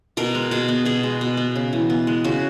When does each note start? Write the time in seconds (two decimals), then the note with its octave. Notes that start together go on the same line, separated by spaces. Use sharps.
0.17 B2 A#4
0.35 G#3
0.51 B2 G#4
0.68 B3
0.85 B2 G#4
1.03 G#3
1.21 B2
1.37 B3
1.56 C#3
1.73 E3
1.90 B3
2.07 G#3
2.24 C#3 F#4